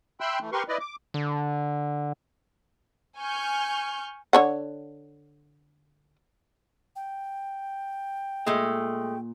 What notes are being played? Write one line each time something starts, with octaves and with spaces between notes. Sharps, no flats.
E5 G5 B5 C6 E6 F#6
E3 A3
G4 A#4 B4 C6 C#6
E4 B4 D5 D#5
D6
D3
G#5 C#6 F6 G6
D3 C#5 F#5
G5
A#2 G#3 A3